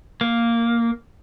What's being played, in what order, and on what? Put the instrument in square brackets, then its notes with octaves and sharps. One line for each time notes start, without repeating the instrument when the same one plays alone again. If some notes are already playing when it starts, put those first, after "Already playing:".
[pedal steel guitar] A#3